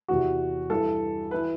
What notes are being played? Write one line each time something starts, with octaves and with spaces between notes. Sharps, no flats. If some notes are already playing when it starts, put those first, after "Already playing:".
E2 C3 E3 F#4
G2 E3 A4
E3 B4